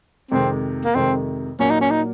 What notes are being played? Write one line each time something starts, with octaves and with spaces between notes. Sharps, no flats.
F2 C3 D#3 G#3 C4
A#3
F2 C3 D#3 G#3 C4
A#2 F#3 A#3 C#4
D#4
C#4
D#4